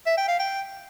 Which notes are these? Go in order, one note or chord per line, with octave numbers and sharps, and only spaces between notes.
E5
G5
F5
G5